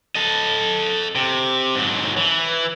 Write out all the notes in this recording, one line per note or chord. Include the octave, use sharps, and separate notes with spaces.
A4 D#5
C3
G#2 F#3
E3